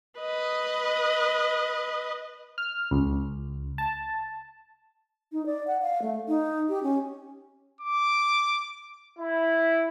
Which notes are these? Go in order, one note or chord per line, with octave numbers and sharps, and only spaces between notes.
B4 D#5
F6
C#2
A5
D#4
D5
F#5
F5
A3
D#4
G4
C#4
D6
E4